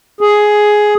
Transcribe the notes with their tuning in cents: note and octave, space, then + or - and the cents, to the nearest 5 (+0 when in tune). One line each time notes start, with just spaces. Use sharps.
G#4 +10